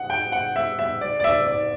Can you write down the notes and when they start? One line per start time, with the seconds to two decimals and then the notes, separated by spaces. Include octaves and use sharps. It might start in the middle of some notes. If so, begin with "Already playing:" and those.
Already playing: F#5
0.10 G5
0.32 F#5
0.56 E5
0.79 E5
1.01 D5
1.20 D5
1.24 E5
1.47 D5